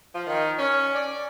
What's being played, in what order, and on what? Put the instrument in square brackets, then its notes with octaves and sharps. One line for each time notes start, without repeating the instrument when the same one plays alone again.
[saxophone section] F3
D#3
C#4
D5